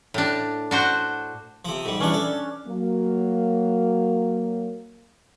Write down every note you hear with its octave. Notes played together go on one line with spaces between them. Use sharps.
A2 D4
D4 F#4 C5
C3 F3
G#2 G3
E3 G3 C#4 D4 C#5
A4
F#3 A#3